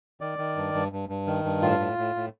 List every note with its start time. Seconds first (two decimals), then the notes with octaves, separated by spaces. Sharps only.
0.21 D#3 D5
0.38 D#3
0.56 G2
0.74 G2
0.92 G2
1.09 G2
1.27 D#3
1.44 G2
1.62 A2 F4
1.80 A2
1.98 A2
2.16 A2